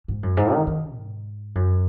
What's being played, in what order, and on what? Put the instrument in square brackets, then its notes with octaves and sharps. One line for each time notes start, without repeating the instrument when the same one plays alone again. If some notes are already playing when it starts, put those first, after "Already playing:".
[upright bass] G#2
F#2
G#2
D#3
D#3
G#2
F#2